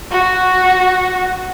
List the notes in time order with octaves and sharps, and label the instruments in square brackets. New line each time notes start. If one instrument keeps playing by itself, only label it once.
[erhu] F#4